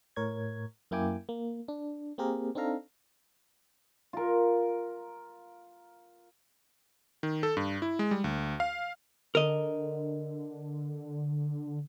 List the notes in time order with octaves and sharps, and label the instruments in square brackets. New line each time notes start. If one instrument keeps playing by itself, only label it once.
[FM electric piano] A2 A#4 C#5 G#6
F#2 A#3 E4 G5 G#5 D6
A#3
D4
A#3 C4 G4 G#4 A#4
C4 D4 D#4 A4 F5 A#5
[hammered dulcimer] F4 A#4
[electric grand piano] D#3
A4
G2
E4
G#3
G3
D2
F5
[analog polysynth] D3 [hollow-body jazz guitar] A#4 D#5